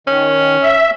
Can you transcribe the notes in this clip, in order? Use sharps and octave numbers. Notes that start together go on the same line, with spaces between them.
D#3 C#4
E5